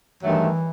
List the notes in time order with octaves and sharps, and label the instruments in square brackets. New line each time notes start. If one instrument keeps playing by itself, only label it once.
[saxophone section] G2 D#3 F#3 A3 [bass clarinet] E3